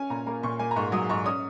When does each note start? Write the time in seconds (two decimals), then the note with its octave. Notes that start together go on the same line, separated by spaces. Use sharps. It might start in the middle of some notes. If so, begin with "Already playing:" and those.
Already playing: C#4 G#5
0.10 A#2 A#5
0.26 A#3 A#5
0.43 A#2 C#6
0.59 A#3 G#5
0.71 A#5
0.76 G#2 C#6
0.92 F#3 D#6
1.09 G#2 C#6
1.26 C#4 D#6